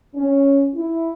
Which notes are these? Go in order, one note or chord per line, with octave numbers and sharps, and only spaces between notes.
C#4
E4